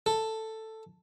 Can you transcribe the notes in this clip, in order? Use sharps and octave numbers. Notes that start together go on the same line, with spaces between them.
A4